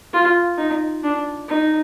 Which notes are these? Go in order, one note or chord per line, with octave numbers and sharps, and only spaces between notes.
F4
D#4
D4
D#4